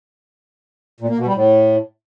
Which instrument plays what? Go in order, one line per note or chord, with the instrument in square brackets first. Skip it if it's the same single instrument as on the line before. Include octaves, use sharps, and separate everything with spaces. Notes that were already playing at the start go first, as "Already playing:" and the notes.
[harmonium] A#2
A#3
B2
G3
A2